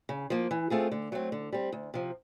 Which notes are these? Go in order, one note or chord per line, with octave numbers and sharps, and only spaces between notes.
C#3
F3 A#3
E3
A3 C4 F4 G#4
D3
F#3 A3 C4
D3
G3 C4
D2
C3 F3